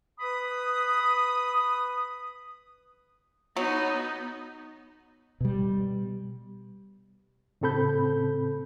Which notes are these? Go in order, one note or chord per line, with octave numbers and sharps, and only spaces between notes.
B4 B5 D#6
F#3 B3 D#4
B2 G3
A2 C#3 C4 A4 B5 G6